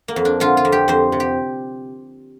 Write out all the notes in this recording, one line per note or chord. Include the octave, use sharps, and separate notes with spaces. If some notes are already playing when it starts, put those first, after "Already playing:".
A#3
F2
D4
D3 F4
F4
F2
G4
F2 C5
C3
G4